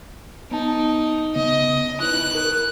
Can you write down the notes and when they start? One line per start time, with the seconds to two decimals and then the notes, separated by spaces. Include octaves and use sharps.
0.51 B3 D#4 A5
1.35 C#3 B3 D#5
2.00 D#4 E4 B4 F#6
2.35 A#4